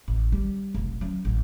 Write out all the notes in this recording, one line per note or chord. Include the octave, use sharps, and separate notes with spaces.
A1
G3
F1 B1
F#3 C#4
A1